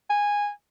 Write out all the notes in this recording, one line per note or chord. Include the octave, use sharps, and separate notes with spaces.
G#5